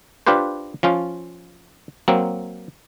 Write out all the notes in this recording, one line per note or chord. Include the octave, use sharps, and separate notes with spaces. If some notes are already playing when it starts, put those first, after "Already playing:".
D4 F4 G4 B4 C5
F3 C#4 F4
F#3 A#3 C4